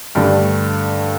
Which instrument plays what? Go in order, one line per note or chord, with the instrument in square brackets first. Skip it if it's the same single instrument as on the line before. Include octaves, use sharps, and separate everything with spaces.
[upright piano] G2 D3 A3 D5